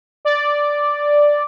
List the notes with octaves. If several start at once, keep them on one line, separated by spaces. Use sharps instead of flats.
D5